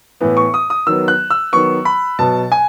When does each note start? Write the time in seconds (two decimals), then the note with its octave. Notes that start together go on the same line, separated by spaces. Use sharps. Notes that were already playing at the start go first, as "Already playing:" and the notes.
0.21 A2 E3 B3
0.37 C#6
0.54 D#6
0.70 D#6
0.87 D#3 F#3 B3 E6
1.08 F#6
1.30 E6
1.52 D#3 F#3 B3 C#6
1.85 B5
2.19 B2 F#3 B3 A5
2.52 G#5